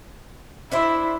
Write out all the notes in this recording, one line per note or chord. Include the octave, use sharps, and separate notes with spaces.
D4 E4 C5 E5